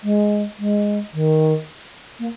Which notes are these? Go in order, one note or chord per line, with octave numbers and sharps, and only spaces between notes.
G#3
G#3
D#3
A#3